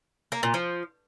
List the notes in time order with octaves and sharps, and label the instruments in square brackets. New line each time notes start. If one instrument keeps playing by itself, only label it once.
[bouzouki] A#3
A#2
F3